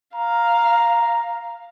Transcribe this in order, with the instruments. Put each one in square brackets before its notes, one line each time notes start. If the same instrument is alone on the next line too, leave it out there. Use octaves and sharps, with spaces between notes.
[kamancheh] F5 [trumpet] A#5